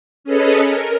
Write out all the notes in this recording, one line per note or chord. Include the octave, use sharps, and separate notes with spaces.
C#4 G#4 A4 B4 C#5 D#5
A#4